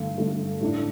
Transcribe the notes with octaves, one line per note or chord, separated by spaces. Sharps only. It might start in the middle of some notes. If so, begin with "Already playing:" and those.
Already playing: G2 D3 A3
G2 D3 A3
A2 A3 D4